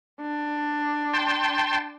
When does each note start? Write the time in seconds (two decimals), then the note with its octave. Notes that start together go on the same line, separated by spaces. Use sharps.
0.21 D4
1.13 G5 A5 C6